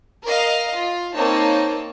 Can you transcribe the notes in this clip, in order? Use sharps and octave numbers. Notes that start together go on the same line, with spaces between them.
A#4 D#5 F5
F4
A#3 C4 D#4 C#5 A5